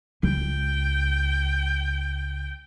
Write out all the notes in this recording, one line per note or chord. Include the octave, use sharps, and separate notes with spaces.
C#2 G5